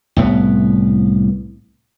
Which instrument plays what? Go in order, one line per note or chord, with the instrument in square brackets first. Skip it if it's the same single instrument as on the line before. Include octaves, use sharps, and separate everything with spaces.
[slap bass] C2 A2 B3